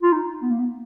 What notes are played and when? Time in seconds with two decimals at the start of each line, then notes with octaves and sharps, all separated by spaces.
0.02 F4
0.12 D#4
0.42 B3
0.50 A#3
0.59 B3